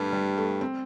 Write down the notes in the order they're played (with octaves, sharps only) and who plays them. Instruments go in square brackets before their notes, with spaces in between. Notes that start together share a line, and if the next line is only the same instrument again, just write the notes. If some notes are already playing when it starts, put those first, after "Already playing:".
Already playing: [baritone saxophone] G2 [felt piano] G3 A3
[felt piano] G3
A3
C4